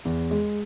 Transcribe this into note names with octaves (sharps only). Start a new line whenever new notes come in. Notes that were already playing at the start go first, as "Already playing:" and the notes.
E2
G#3